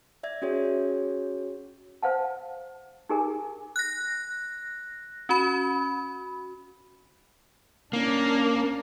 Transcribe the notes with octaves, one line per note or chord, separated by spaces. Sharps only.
D5 E5 G#6
C#4 F#4 G#4 C#5
C5 F5 F#5 A5
D#4 G4 G#4 A#4 G#5
F#6 A#6
C#4 F#4 B5
A#3 C#4 D4